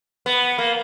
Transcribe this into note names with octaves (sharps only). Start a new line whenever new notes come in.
B3
A#3